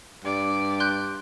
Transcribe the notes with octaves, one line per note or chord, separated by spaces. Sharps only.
G2 D5
C6 F#6 G6